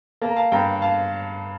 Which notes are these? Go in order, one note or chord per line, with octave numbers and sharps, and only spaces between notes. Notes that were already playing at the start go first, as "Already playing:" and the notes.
A#3 A5
A#5
F5 A5
G2 G5 A#5
F5 A5